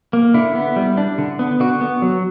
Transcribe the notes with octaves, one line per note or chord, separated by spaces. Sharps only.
A#3
D3 E4
B3
G3
D4
D3
B3
D3 F#4
B3
F#3